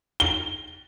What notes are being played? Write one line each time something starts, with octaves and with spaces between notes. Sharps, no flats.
G7